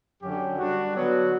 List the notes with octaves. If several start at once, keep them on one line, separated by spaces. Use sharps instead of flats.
F#2 D3 F#3 C#4 G4
G3 D4 F#4
D3 F#3 B3 F#4